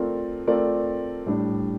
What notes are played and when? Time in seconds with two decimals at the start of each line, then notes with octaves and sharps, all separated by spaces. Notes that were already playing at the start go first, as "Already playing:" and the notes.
Already playing: A3 C4 F4 A#4 D5
0.47 A3 C4 F4 A#4 D5
1.26 A2 G3 D4